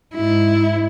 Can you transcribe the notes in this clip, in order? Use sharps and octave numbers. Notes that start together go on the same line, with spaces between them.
G#2 E4